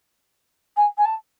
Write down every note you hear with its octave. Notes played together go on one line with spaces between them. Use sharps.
G#5
G#5
A5